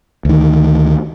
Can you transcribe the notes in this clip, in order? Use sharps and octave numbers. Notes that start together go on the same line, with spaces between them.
D2 D#3